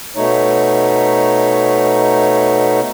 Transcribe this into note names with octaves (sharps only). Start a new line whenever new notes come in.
B2 A3 D#4 C#5